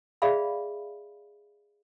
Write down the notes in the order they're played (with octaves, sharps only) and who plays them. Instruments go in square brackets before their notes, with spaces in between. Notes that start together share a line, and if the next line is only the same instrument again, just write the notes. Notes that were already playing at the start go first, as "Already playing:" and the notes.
[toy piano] G#4 D5 E5 F5 B5